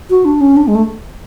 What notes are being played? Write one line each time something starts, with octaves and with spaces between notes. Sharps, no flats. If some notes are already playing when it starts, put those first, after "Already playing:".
F#4
D4
C#4
D4
G#3
A3